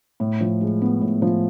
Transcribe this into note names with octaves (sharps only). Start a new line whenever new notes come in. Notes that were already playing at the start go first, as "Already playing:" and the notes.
A2
F3
G#3
B3
A2
F3